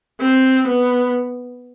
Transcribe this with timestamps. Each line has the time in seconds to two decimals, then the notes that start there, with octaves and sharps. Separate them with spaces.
0.21 C4
0.67 B3